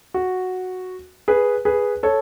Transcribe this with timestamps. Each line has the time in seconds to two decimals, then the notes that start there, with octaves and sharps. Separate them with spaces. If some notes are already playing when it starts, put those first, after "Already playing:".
0.14 F#4
1.28 G#4 B4
1.65 G#4 B4
2.03 A4 C#5